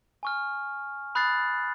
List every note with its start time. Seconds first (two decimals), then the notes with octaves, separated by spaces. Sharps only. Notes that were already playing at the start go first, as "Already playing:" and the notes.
0.23 G#5 C#6 F6
1.15 B5 D#6 F#6 A6 C7